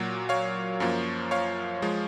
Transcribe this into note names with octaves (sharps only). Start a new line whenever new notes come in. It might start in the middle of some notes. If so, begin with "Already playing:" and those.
Already playing: A#2 F#3 A#3
C#5 F5
F#2 F3 A#3
C#5 F5
F3 G#3